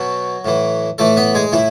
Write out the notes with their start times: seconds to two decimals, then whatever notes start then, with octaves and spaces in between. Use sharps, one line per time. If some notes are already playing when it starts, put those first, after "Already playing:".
Already playing: B2 F#3 F#4
0.45 A2 E3
0.98 A2 E3 A3 A4
1.17 B3 B4
1.34 G#3 G#4
1.52 A2 E3 E4